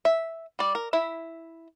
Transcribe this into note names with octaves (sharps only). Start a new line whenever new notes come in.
E5
G3 D5
A#4
E4 E5